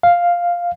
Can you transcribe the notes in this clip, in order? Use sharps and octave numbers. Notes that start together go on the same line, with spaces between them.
F5